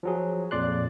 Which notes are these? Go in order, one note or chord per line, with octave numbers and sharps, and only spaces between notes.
F3 F#3 G#4
F2 A#2 D5 C6 F#6